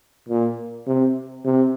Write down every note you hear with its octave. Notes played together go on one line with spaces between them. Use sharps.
A#2
C3
C3